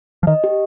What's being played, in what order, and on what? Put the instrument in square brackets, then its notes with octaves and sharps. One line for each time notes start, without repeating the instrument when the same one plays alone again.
[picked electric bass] F3
[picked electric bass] D#3 [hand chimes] D#5
[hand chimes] G4